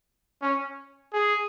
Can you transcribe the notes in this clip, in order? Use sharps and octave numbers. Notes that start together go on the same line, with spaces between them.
C#4
G#4